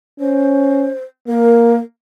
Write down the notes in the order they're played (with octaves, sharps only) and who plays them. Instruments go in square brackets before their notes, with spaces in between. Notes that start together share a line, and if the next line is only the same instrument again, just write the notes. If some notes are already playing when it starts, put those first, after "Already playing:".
[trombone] C#4 [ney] C5
[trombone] A#3 [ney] A#4